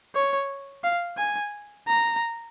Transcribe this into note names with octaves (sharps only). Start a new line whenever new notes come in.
C#5
F5
G#5
A#5